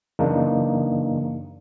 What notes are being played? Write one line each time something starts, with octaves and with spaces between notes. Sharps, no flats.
F#2 C#3 E3 A#3 D4 D#4